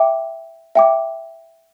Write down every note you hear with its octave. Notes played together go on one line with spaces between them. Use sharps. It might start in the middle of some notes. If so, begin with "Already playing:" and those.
Already playing: E5 G5 D6
E5 G5 D6